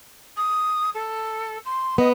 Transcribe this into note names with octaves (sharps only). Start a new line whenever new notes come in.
D#6
A4
C6
B3 D#5